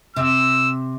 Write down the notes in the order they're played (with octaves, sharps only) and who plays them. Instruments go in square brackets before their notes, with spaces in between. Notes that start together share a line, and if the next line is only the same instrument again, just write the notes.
[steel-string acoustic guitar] C3 [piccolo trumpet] E6